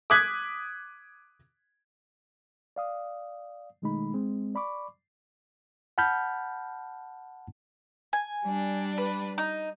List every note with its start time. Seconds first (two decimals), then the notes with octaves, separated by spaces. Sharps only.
0.10 D6 D#6 F#6 G#6 B6
2.76 D5 F5 D#6
3.82 B2 D#3 G#3 A3 D#4 B5
4.14 G#3 C4
4.55 D5 B5 C#6 D6
5.98 F#5 A5 B5 F6 G6
8.13 G#5
8.44 G3 D4
8.98 B4
9.38 D#4